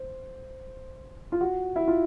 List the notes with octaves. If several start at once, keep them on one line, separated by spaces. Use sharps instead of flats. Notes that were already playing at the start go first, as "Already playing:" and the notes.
Already playing: C5
F4
F#4
E4
F4